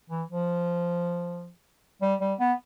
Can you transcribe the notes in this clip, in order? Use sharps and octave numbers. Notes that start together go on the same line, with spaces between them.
E3
F3
G3
G3
B3